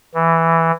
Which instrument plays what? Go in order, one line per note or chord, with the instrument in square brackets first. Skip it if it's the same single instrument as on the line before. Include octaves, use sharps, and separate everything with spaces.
[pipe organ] E3